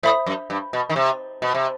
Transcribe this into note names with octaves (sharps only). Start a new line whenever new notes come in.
A2 C5 E5 B5 D#6
F#2
G2
B2
D#3
C3
B2
C3